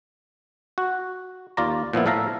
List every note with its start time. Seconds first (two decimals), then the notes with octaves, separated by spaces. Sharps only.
0.78 F#4
1.57 D#2 F4 D5 A#5
1.93 A#2 F3 B3 E4
2.06 A2 A4 E5 F5 A#5